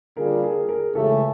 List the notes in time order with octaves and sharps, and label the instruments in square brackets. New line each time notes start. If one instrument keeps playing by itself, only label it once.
[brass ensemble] D3 G3 A#3 D4 F4 [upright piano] G#4 A#4
[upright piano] G#4 A#4
G#4 A#4
[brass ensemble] C#2 C#3 E3 A3 [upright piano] G4 A4